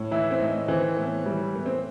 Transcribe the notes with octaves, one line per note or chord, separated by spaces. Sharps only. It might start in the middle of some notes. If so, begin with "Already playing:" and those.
Already playing: A2
E3 E4
C4
A2 D#4
E3 C4
A2 B3
E3 G3
A2 B3
C4